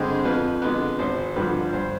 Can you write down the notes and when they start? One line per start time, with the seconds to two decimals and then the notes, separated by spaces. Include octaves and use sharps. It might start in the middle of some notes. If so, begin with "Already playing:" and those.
Already playing: G2 D3 G#3 C4 G#4
0.25 F2 B4
0.62 D3 G#3 B3
0.99 G#1 C5
1.36 G2 D3 F3 B4
1.72 G2 C5